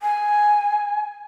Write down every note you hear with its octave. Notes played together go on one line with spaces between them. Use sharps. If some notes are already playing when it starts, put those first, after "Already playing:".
G#5